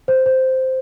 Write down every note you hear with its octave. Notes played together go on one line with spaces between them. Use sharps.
C5
C5